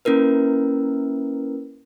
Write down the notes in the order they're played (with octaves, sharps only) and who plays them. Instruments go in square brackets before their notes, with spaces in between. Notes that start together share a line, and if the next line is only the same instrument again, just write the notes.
[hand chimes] A#3 C#4 E4 A#4 B4